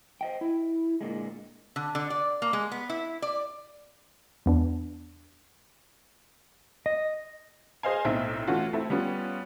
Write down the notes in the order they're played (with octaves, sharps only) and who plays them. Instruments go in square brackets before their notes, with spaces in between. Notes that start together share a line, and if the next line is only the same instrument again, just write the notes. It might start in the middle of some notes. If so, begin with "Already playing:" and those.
[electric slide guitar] C5 D#5 G5
E4
A#2 D3 G#3
[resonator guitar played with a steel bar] D3
D3
D5
A#3
G#3
B3
E4
D5
[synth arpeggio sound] E2 B3 D4
[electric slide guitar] D#5
[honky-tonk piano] G#4 C5 D#5 F5 G#5
B1 A2 C4 D#4 E5
E3 A3 C#4 F4 F#4
A3 C4 E4 A4
G3 B3 C#4 F4